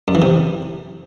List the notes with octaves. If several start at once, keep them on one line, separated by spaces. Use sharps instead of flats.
F#2
E3
C3